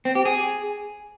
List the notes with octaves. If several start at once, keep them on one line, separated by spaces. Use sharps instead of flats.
C4
G4
G#4